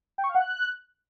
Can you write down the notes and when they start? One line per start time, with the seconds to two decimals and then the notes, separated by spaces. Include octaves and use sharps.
0.18 G5
0.24 C#6
0.29 F5
0.35 F#5
0.40 F#6